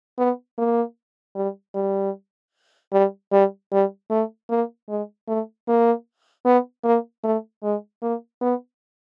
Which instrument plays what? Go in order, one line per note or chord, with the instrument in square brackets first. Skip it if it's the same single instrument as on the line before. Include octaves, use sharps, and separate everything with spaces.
[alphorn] B3
A#3
G3
G3
G3
G3
G3
A3
A#3
G#3
A3
A#3
B3
A#3
A3
G#3
A#3
B3